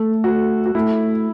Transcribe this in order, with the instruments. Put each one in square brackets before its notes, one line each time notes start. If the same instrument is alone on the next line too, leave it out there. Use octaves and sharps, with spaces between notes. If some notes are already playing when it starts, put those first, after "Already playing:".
Already playing: [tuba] A3 [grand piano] A4
[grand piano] F#4
F#4
[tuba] A3 [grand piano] E4